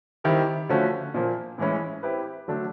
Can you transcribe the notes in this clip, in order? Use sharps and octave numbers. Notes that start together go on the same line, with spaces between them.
D#3 G3 C4 E4 G4
D3 F3 A3 C#4 F#4
A#2 F3 A#3
A2 E3 G#3 C#4 E4
C4 E4 G4 B4
D3 F#3 A3 D4